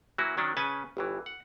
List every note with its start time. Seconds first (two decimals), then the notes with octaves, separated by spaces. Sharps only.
0.18 E3 F#3 A#3 E4 F#4
0.37 D#3 F#3 C#4 D4
0.57 C#3 C#4 B4 G#5 A5
0.97 G1 G2 E3
1.26 F#5